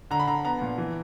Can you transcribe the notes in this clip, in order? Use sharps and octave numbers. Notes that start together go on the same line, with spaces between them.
D3 A#5
B5
D3 A#5
B3 A#5
A#2
E3